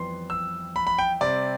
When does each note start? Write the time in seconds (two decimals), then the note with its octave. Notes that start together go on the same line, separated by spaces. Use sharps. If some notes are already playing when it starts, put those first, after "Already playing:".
Already playing: F2 E3 G3 B3 C6
0.30 E6
0.76 B5
0.87 B5
0.98 G5
1.21 C3 G3 C4 D5